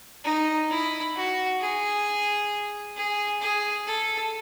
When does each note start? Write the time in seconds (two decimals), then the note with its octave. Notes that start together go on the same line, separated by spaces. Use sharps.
0.24 D#4
0.69 E4
1.16 F#4
1.60 G#4
2.96 G#4
3.41 G#4
3.87 A4